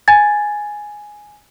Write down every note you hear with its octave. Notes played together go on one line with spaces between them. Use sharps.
G#5 G#6 A6